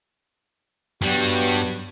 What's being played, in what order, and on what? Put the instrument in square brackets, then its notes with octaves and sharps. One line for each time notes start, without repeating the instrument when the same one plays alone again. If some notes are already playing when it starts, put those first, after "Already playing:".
[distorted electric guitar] G2 G3 [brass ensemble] F#3 B3 F#4